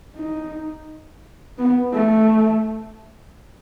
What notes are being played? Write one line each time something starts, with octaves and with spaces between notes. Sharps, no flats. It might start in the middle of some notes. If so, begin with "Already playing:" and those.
D#4
B3
A3